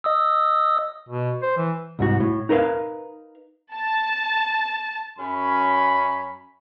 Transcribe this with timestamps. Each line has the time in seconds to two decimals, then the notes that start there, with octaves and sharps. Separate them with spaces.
0.04 D#5 D#6 E6
1.09 B2
1.42 C5
1.57 E3
1.99 C2 G#2 F#4
2.20 A2
2.49 D#4 A#4 B4 D#5 F5
3.75 A5
5.19 F#2 C#4 B5